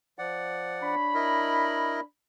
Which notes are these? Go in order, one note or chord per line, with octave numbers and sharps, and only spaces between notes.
F3 D5 F#5
D4 C#5 B5
E4 A#4 D#5